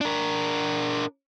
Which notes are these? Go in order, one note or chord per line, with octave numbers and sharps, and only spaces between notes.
D4 A#4